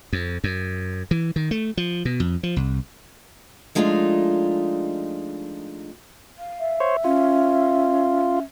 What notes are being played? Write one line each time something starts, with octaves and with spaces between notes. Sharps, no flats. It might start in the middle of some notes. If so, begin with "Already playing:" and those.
F2
F#2
E3
D#3
A3
F3
B2
F2
F3
C2
F3 G#3 A3 D4 D#4 F4
F5
E5
C5 C#5
C#4 F4